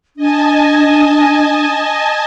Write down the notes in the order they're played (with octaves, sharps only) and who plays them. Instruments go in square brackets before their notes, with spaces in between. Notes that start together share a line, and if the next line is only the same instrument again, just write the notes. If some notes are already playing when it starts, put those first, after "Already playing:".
[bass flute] D4 [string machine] D#5 G#5 A5